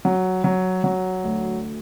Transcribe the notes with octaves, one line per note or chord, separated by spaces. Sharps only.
F#3
F#3
F#3
D2